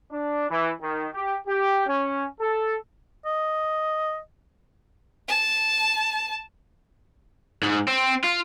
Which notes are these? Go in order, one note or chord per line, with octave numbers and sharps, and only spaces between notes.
D4
E3
D#3
G4
G4
C#4
A4
D#5
A5
G#2
C4
F4